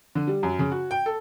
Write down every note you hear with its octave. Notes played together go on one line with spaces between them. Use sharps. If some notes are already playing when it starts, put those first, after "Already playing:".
D3
G3
F#2
C#3
F#4
G5
A4